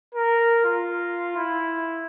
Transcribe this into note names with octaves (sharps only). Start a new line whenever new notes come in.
A#4
F4
E4